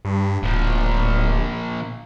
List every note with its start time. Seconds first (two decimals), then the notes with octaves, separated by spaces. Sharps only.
0.05 G2
0.43 D1 A#2 F3